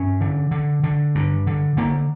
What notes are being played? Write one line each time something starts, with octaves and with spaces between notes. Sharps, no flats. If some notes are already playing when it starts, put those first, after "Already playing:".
Already playing: G2 C#4
D3
D3
D3
G2
D3
D3 A#3